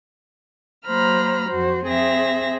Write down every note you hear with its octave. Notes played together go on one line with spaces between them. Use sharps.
F#3 A#3 C5 A#5 B5 F6
F2 F#4 C5
C4 G#4 E5 A#6